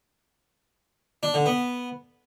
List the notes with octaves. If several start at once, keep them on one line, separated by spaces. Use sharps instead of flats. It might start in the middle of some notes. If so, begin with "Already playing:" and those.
D4
D3
B3